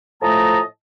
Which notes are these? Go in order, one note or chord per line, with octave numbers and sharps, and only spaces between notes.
A2 F3 A3 D#5 A5 A#5